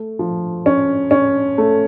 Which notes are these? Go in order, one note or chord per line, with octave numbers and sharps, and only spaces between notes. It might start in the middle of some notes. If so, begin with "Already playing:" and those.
Already playing: A3
F3
C#4
C#4
A3